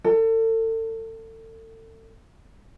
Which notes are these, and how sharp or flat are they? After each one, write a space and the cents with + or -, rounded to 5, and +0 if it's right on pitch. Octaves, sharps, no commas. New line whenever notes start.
A4 +35